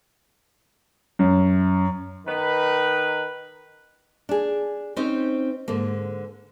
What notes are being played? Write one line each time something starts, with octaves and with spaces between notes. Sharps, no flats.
F#2
D#3 B4
D4 G#4
C4 C#4 D#4 C5
G#2 D3 A#3